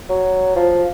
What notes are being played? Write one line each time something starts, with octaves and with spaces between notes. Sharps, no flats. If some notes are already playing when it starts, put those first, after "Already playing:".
F#3
F3